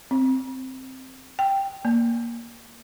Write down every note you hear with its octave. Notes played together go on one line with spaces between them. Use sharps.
C4
G5
A#3